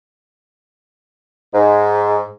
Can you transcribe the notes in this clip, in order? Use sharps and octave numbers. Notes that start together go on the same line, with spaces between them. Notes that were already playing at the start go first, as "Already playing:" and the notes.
G#2